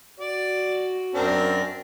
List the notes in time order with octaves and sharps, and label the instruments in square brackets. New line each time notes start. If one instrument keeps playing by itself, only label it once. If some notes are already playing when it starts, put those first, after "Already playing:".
[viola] F#4 [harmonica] D5
[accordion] F#2 [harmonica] C4 D4 A#4